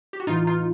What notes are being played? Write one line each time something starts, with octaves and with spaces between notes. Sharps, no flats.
G4
F#4
A2 E3 D#4 F4
D#4 F4